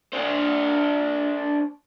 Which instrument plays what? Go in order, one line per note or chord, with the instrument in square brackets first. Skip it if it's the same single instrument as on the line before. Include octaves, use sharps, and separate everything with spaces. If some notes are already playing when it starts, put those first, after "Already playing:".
[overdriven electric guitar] D4 C5